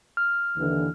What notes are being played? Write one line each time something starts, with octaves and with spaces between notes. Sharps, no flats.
F6
D#2 D3 E3